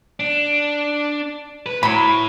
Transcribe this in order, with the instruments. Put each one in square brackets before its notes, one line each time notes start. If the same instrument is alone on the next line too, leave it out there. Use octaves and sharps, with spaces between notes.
[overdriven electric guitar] D4
B4
[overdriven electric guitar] A2 [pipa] F#3 B5